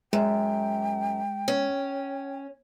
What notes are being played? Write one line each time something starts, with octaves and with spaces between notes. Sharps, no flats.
F#2 G#3 G5
C#4